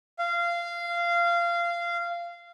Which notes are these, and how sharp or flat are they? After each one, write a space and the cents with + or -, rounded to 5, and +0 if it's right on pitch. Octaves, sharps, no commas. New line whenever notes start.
F5 -20